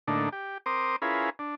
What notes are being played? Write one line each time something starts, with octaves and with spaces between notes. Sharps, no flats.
A2 D3 A#3 D4 D#4
G4
C4 A#4 C5 D6 D#6
C#4 E4 F4 G#4 A#4 B4
D4